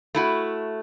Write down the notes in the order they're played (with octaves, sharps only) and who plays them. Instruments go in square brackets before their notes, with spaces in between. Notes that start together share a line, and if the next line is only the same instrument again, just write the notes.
[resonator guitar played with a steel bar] A3 E4 F#4